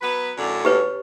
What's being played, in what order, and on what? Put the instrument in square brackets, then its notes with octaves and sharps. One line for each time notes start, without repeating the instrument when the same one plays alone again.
[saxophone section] F#3 B3 B4
F#2 A2 D3
[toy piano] G4 B4 C#5